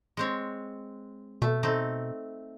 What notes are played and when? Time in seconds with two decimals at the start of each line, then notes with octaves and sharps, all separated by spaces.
0.17 G#3 C4 C#5
1.42 B2 A3
1.63 A3 C4 D#4